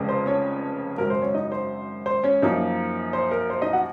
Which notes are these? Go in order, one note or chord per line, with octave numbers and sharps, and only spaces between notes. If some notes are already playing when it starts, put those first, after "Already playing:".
Already playing: F1 F2 C#3 G#3
C5
C#4 C#5
G#1 F#2 C#3 F#3 C4 A#4
C5
C#4 C#5
D#4 D#5
C5
C5
C#4 C#5
F#2 F3 A#3 D#4
C5
A#4
C5
D#4 D#5
F#4 F#5